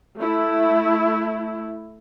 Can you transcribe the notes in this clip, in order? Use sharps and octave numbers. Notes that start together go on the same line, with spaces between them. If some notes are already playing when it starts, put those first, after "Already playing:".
A3 E4